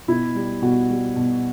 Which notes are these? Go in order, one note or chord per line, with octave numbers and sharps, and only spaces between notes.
B2 E4
G3
B2 F#4
G3
B2